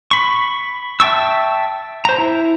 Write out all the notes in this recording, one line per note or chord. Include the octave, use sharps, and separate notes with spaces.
B5 C#6
E5 G5 A5 C#6 E6
C5 A#5
E4